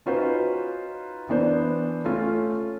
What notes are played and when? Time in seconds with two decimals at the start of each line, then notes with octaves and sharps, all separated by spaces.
0.06 C#4 D#4 F4 F#4 B4 C5
1.29 E3 B3 D4 C5
2.04 A3 C#4 F4